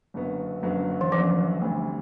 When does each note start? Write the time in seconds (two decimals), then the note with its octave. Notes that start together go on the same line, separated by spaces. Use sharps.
0.14 F#1 F#2 D3 F#3 B3
0.62 F#1 F#2 D3 F#3 B3
1.01 E3
1.12 F#1 F#2 D3 F3 F#3 B3
1.61 D2 D3 G3 C4